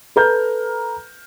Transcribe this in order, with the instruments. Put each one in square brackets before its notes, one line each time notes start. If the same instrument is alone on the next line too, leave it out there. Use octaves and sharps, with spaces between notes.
[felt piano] A4 B4 A#5 F6 G6